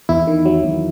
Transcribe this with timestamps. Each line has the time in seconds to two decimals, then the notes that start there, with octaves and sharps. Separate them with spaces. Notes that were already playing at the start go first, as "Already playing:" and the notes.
0.09 E2 E4
0.27 D#3
0.46 F#3
0.64 E2